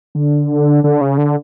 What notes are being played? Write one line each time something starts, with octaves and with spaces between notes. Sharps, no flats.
D3
D3
C#3
D3